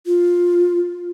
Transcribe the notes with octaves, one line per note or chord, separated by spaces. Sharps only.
F4